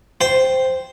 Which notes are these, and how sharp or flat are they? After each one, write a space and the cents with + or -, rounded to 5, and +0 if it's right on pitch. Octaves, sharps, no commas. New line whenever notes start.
C5 -5 G5 +0 C6 +0